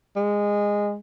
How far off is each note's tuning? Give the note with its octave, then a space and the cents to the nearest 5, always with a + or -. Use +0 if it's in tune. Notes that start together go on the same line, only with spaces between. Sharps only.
G#3 -15